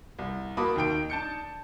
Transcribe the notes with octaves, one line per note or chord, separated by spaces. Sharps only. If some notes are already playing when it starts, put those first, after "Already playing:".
C2
A#3 F#4 A5 B5 D6 D#6
D#2 D#3 G5 D7
D4 A5 G6 C#7